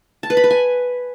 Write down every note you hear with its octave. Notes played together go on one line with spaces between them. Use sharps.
A5
B4
B5
B4
G#5